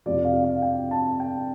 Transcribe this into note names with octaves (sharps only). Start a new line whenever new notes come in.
F2 C3 F3 C4 D5
F5
F5
G5
A5
G5